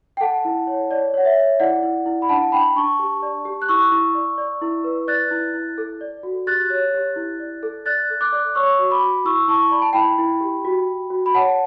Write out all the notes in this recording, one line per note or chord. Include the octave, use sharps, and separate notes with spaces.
G5
A4 F#5 A5
E4
C#5
C#5 D5
C#5 F#5
E5
C#5
E4 D5 F#5
E4
E4
B5
D4 F#5 A5
D4 G5 B5
D4 A5 C#6
G4
D5
G4
F#6
E4 C#6 E6
E4
D5
D5
E4
B4
D5 F#6 A6
E4
E4
A4
D5
F#4
G4 F#6 A6
C#5
G4
E4
D5
A4
D5 F#6 A6
A4
D6 F#6
D5
C#5 C#6 E6
F#4
B5 D6
F#4
E4 C#6 E6
E4 A5 C#6
D5 B5
A5
E4 G5 B5
E4
G4
F#4
F#4
F#4
B5
C#5 F#5 A5